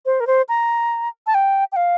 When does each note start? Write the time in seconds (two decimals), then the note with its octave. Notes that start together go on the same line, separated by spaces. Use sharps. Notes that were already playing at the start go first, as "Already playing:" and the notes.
0.06 C5
0.20 A#4
0.27 C5
0.49 A#5
1.27 A5
1.34 G5
1.72 G5
1.76 F5